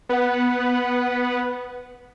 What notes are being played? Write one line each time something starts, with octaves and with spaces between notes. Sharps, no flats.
B3 B4 F#5